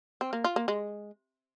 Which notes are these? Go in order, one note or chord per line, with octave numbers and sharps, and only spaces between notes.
C4
A#3
F4
A#3
G#3